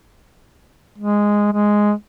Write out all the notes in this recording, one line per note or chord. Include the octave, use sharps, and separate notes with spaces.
G#3
G#3